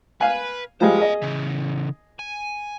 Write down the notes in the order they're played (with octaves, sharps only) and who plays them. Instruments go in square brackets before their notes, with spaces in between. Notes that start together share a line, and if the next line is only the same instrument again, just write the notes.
[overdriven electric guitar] B4 [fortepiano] F5 G#5
[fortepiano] F3 G3 G#3 [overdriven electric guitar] C5 F5
[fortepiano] G#4 D#5
[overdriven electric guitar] C#3 E3
G#5